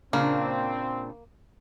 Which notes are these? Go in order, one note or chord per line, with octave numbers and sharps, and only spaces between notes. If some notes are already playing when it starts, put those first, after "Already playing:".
A#2 C#3 A#3 C4 D4